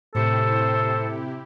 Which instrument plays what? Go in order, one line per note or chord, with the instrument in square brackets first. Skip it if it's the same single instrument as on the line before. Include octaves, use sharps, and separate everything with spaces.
[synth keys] A2 C#7 [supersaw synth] C3 E4 G4 [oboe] A4 [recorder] C5